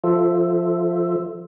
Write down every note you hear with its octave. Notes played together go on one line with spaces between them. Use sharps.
F3 F4 A4 C5 E5